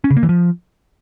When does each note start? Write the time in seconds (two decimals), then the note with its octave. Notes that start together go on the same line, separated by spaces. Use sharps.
0.04 C#4
0.10 C#3
0.17 A#3
0.23 E3
0.29 F3